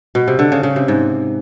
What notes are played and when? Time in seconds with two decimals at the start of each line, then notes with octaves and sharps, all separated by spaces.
0.15 B2
0.28 C3
0.39 D3
0.52 C#3
0.63 C#3
0.76 C3
0.88 G#2